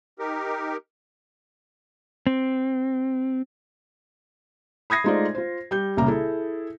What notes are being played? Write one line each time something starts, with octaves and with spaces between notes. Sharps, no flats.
D#4 G4 A#4
C4
B5 D#6 G#6 A#6 C7
G#3 A3 D#4 F4 C5 D5
F4 C5
G3 G6
C2 A#2 C#3 A#3 A#5
E4 G#4 A4